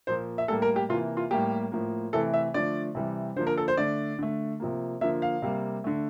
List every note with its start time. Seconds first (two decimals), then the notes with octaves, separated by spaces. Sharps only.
0.07 A#2 F3 A#3 C5
0.38 E5
0.48 A2 G3 A#3 A4
0.62 A#4
0.76 G4
0.89 C3 E3 A#3 F4
1.17 F4
1.31 A2 G3 A#3 G4
1.72 A2 F3 A#3
2.13 C3 E3 A3 A4
2.34 E5
2.54 D3 F3 A3 D5
2.95 C3 E3 G3
3.36 D3 F3 A#3 C5
3.47 A#4
3.57 A4
3.68 C5
3.77 D3 A3 D5
4.19 D3 A3
4.60 C3 F3 A#3
5.01 D3 F3 A#3 E5
5.22 F5
5.42 C3 G3 A#3
5.84 D3 A3